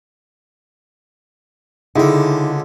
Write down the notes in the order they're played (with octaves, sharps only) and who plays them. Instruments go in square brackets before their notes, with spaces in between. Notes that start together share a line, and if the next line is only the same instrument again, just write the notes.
[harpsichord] C#2 D3 [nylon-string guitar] D#4 E4 G#4